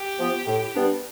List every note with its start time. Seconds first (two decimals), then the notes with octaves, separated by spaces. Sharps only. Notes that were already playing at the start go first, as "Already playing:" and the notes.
Already playing: G4
0.19 F3 B3
0.47 A2
0.75 G3 B3 D4